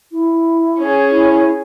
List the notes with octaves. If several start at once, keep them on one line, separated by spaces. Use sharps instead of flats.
E4
C#4 G#4
E4